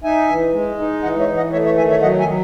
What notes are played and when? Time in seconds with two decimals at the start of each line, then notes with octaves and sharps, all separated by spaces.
0.04 D#4 E5 G#5
0.29 E3
0.53 G#3
0.79 D#4
1.03 E3 D#5 F#5
1.20 C#5 E5
1.29 E3
1.37 D#5 F#5
1.52 A3 C#5 E5
1.65 C#5 E5
1.77 D#3 E5 G#5
1.90 C#5 E5
2.02 F#3 D#5 F#5
2.19 E5 G#5
2.28 F#3